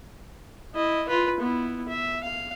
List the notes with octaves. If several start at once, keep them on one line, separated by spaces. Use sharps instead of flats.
E4 D#5
F4 B4
B3 E4
E5
F5